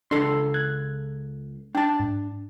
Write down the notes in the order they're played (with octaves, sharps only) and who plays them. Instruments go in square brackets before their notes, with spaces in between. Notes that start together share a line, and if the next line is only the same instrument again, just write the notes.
[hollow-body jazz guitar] C#2 A4 C6 [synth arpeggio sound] D4
[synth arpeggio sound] F#6 G#6
[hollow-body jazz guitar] D4 A5 [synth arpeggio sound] G5
[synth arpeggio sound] G#2